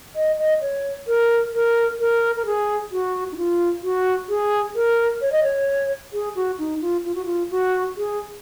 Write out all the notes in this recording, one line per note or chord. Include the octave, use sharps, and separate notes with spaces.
D#5
D#5
C#5
A#4
A#4
A#4
A#4
G#4
F#4
D#4
F4
F#4
G#4
A#4
C#5
D#5
C#5
G#4
F#4
D#4
F4
F4
F#4
F4
F#4
G#4